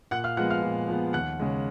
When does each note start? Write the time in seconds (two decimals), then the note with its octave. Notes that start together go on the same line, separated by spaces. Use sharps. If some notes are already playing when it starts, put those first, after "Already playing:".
0.11 A#2 F#5 F#6
0.24 F5 F6
0.37 F3 G#3 B3 F#5 F#6
0.50 F5 F6
0.62 A#2
0.88 F3 G#3 B3
1.13 D#2 F#5 F#6
1.40 C#3 G#3